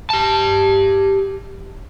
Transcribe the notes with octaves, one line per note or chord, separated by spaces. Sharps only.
G4 A5